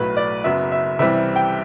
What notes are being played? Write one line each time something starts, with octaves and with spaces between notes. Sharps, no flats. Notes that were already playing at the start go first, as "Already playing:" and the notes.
Already playing: B1 A2 F#3 B4
D5
F#1 F#2 F#3 B3 E5
E5
C2 C3 E3 G3 C4 E5
G5